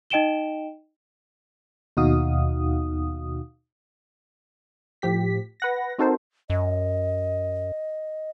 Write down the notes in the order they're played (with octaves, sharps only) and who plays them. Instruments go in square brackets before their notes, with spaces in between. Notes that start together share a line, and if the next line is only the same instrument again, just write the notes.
[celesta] D#4 D#5 G5 D7 E7 G7
[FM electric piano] D#2 B2 D#4 F#4 F5 D#6
[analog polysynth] A2 F3 G4 B6
B4 F#5 A#6
C4 D#4 F#4 A4 A#4 C5
[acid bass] F#2 [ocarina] D#5